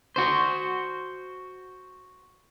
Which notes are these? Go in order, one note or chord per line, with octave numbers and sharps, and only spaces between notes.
F#4 C5